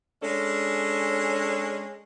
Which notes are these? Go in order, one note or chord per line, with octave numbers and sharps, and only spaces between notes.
G#3 C#4 D4 A4